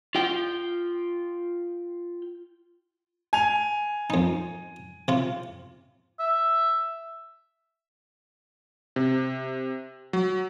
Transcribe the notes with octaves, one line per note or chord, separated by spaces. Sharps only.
F4 G5
G#5 F7
F2 D#4
C3 F4
E5
C3
F#3